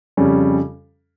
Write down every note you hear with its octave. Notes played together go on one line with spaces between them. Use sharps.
F2 C#3 G3 C#4